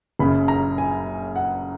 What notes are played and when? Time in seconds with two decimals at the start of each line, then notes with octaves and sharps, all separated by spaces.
0.19 F#1 F#2 C#3 B5
0.48 A#5
0.78 G#5
1.36 F#5